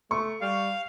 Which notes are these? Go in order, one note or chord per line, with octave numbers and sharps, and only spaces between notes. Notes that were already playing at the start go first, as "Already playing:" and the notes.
A3 C#6
G3 F5